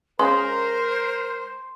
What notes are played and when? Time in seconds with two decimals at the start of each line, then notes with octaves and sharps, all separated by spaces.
0.19 G#3 C#4 F4 A#4 C5 C6